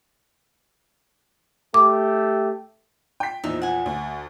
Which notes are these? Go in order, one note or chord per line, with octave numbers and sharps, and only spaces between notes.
A3 G4 D6
G5 B6
E2 A#2 F3 D#4 E5
F#5 G#5
D2